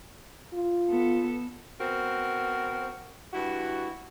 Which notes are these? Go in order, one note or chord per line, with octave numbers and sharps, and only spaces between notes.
F4
B3 A4
B3 C4 F#4 A#4
G2 E4 F#4